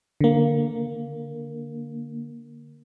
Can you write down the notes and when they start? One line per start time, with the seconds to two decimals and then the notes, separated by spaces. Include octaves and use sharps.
0.21 D3 A#3